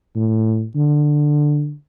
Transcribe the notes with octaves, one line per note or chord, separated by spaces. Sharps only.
A2
D3